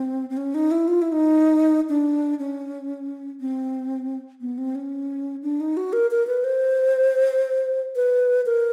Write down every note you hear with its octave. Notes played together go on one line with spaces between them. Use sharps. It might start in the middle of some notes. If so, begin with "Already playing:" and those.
Already playing: C4
C4
C#4
D#4
E4
F4
E4
D#4
D4
C#4
C4
B3
C4
C#4
D4
D#4
F#4
A#4
A#4
B4
C5
B4
A#4